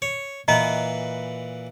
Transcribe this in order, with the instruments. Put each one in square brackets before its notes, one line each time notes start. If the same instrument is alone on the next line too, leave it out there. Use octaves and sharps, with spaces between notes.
[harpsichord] C#5
[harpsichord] A#2 E3 B4 [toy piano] D#5 A#5